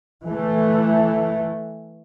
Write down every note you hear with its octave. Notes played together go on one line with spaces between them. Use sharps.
E3 A3